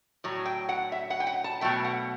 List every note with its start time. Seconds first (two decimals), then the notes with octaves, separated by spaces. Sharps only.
0.24 A2 F#3
0.46 G5
0.69 F#5
0.92 E5
1.10 F#5
1.20 G5
1.27 F#5
1.44 A5
1.61 B2 F#3 A3 G5
1.84 F#5